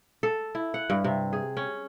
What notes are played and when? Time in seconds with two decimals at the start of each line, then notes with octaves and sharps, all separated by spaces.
0.23 A4
0.55 E4
0.74 F#5
0.90 G2
1.04 C3
1.33 G#4
1.57 C#4